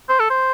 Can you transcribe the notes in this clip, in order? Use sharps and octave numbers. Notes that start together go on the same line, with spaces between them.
C5
A4
C5